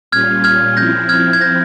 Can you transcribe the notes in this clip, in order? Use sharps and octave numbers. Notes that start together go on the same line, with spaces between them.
A#2 G3 C#4 F4 F6 G#6
F6 G#6
F3 C4 E4 G6 A#6
F6 G#6
G#6
G6 A#6